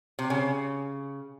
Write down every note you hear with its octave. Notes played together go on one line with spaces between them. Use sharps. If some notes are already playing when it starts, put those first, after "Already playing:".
C3
C#3